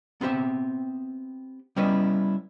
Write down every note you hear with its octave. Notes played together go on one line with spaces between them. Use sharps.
B3 C4 G4 E5
G3 B3 C#4 E4 B4 D#5